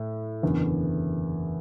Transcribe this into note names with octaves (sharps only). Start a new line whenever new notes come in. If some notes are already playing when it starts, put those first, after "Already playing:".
Already playing: A2
F#1 E2 D3